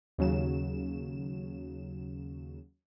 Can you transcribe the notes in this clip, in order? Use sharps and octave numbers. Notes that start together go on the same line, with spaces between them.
D#2 C#3 F#3 E7